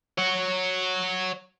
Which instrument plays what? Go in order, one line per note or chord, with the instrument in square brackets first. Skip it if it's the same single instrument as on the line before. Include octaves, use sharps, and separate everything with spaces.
[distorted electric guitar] C#5 F#5